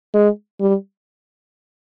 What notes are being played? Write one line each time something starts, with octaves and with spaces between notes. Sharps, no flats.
G#3
G3